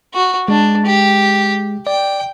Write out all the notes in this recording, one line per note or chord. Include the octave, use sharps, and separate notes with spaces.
F#4
G#3 D4
G4
D5 G5